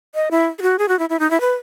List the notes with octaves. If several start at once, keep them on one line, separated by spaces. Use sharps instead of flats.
D#5
E4
G#4
F#4
G#4
F#4
E4
E4
D#4
E4
B4